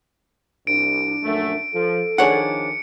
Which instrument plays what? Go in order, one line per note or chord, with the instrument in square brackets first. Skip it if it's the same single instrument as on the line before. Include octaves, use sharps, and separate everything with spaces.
[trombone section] C2 [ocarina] D4 [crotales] D7
[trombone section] A#1 F#2 A3
[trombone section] F3 [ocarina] A4
[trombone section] D#3 F3 D4 [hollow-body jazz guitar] G#4 C#5 F#5 [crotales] C#7